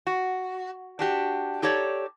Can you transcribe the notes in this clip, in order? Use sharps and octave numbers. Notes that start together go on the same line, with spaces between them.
F#4
D4 F#4 G4
D#4 G4 A4 C#5 D5